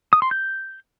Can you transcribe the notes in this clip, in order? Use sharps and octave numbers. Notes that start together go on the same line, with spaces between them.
D#6
C6
G6